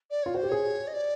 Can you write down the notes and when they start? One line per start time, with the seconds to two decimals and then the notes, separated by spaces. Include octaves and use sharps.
0.10 D5
0.22 F4 C#5
0.34 F#4 C5
0.43 G4
0.49 G#4 C#5
0.87 D#5
0.93 D5